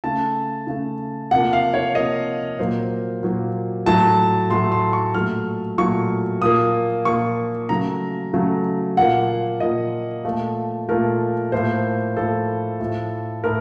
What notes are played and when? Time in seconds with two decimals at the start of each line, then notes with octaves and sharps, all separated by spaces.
0.04 C#3 A3 A5
0.67 C#3 A3
1.31 C3 F3 A#3 F#5
1.53 F5
1.74 C#5
1.95 C3 F3 A#3 D#5
2.59 A#2 F#3 A#3 C5
3.23 A#2 F#3 A#3
3.86 A2 F#3 A3 A5
4.50 A2 F#3 A3 C6
4.72 C6
4.93 C#6
5.14 A#2 F#3 A3 F6
5.78 A#2 F#3 A3 C#6
6.41 A#2 F3 A#3 D#6
7.05 A#2 F3 A#3 C#6
7.69 C#3 F#3 A3 A#5
8.33 C#3 F#3 A3
8.97 A#2 F3 A#3 F#5
9.60 A#2 F3 A#3 D#5
10.25 A#2 F3 A3
10.89 A#2 F3 A3 A#4
11.52 A2 F3 A#3 C5
12.16 A2 F3 A#3 A4
12.80 A2 F3 A3
13.44 A2 A#4